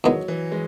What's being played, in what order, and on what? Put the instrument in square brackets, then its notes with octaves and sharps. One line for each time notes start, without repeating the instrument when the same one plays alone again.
[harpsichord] E2 D#3 G#3 B3 [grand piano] F#3
[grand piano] E3
E3 G#3